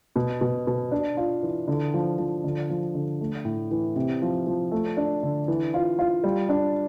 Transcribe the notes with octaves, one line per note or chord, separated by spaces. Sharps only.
B2
B2
B2
D4
F4
E3
D3
F3
F3
D3
F3
D3
A3
A2
E3
C3
F3
F3
A3
D4
D3
E3
F4
F4
G3
D4